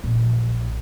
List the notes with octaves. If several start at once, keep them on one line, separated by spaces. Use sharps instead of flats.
A#1